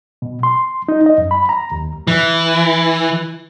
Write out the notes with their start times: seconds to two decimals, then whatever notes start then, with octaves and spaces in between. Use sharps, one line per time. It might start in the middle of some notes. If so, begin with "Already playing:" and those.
0.22 B2
0.43 C6
0.88 D#4
1.06 D#5
1.18 F#2
1.31 B5
1.49 A#5
1.72 D#2
2.07 E3